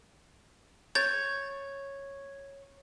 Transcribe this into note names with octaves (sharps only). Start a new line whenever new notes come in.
C#5 G6 A6